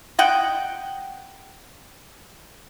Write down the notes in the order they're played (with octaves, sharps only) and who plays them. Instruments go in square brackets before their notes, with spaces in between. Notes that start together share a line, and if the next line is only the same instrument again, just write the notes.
[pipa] D#5 F#5 G5